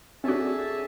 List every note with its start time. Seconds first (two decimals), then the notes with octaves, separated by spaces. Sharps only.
0.24 C4 D4 F#4 G#4 A4 C#5 E5 A5